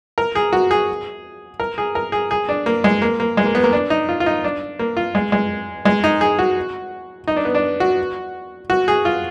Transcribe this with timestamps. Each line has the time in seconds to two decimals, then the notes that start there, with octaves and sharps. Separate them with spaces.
0.18 A#4
0.35 G#4
0.53 F#4
0.71 G#4
1.60 A#4
1.78 G#4
1.95 A#4
2.12 G#4
2.31 G#4
2.49 D4
2.66 A#3
2.84 G#3
3.02 A#3
3.20 A#3
3.37 G#3
3.45 A#3
3.55 B3
3.64 A#3
3.73 D4
3.90 D#4
4.09 F4
4.20 F4
4.26 D#4
4.44 D4
4.79 A#3
4.97 F4
5.15 G#3
5.32 G#3
5.85 G#3
6.04 D#4
6.21 G#4
6.39 F#4
7.28 D#4
7.36 D4
7.45 B3
7.55 D4
7.80 F#4
8.70 F#4
8.88 G#4
9.05 F4